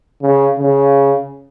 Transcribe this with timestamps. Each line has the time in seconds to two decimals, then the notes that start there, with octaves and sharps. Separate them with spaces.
0.22 C#3
0.59 C#3